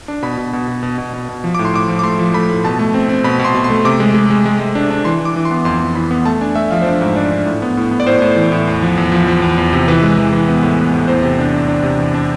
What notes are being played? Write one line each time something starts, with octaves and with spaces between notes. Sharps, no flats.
D4
B2 B5
B2
B2
B2
B2
B2
B2
B2
F3
A2 D6
C6
A2 D6
F3
D6
A3 C6
F3
A3 B5
A2
B2 A5
A3
C4
C4
B2 B5
B2 C6
B2
C6
A3
C3 D6
G#3
G#3
G#3
G#3
G#3
D4
D4
E3 C6
E3
D6
E3
C6
B3
F2 C6
F2
E3 B5
B3
A3 A5
D4 G#5
A3 E5
F3 F5
C5
D4 D5
G#2
D4
D4
A2
B3
A2
B3
D5
A2 C5
A2
E3
A2
E2
F3
E2
F3
F3
E2
E2
C3
E3 B4
G#3
E3
E3
B3
A2
B3
A2
E2 C5
C3
D4
D4
D4
C3
E2
D4